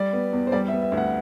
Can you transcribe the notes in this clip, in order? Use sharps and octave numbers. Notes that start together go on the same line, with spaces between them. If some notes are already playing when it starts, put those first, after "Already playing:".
Already playing: G3 D5
B3
E2
C5
G3 D5
E5
B3
E5
D2
F#5